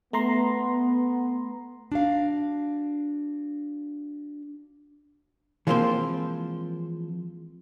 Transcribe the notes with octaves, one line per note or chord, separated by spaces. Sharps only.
A3 B3 A#5 C6
D4 F#4 F5
E3 F3 G#3 A#3 C4 C5